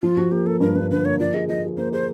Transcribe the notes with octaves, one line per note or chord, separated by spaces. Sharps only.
F3 F4
F3 F#4
A#3 G4
A#3 A4
G2 A#4
G2 B4
D3 B4
A#3 C#5
F3 D5
G#4 D#5
F3 D#5
G#4
A#3 C5
G#4 C5